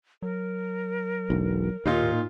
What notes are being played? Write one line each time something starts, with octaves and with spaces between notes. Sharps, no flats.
F#3 A#4
E1 B1
D#2 A#2 D#4 F4
A2